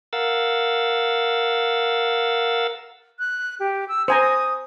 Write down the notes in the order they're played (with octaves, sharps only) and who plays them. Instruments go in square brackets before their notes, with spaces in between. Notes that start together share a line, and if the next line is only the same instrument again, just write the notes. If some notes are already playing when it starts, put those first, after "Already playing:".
[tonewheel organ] A#4 F5 F#5 E6 A6
[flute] F#6
G4
E6
[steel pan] C5 G#5 A#5 [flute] D#6